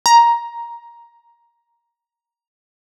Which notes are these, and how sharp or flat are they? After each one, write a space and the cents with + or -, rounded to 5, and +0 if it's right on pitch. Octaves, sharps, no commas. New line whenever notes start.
A#5 +10